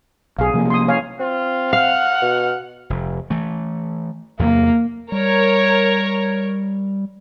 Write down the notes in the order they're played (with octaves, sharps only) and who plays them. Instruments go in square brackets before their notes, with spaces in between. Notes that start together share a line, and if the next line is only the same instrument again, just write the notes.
[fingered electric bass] B1 [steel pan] G#4 F5
[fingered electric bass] C3 F3 A#3
[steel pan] C6 D#6
C#5 F5 G#5
[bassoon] C4 [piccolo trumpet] F4
[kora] F5 [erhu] F#5 [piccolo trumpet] F6
[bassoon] B2
[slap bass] F1
E3 A3
[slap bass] E2 C3 F#3 [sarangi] A#3
[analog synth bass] G3 [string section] A#4 C#5